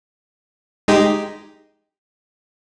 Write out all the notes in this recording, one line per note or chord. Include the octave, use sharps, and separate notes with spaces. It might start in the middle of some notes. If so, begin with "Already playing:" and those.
G#3 D#4 G4